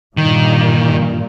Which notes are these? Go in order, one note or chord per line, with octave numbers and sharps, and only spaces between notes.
G2 A#2 D#3